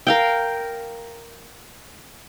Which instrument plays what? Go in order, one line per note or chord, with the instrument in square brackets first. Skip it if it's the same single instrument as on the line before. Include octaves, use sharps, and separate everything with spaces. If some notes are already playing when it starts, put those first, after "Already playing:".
[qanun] A#4 F5 G5